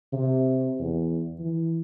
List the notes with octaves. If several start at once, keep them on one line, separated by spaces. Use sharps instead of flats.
C3
E2
E3